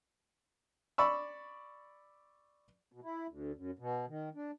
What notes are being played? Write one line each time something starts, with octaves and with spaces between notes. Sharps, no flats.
D5 B5 C#6 E6
B2
E4
D2
F#2
B2
D#3
D4